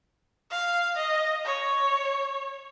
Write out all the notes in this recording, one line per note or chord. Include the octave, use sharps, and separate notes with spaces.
F5
D#5
C#5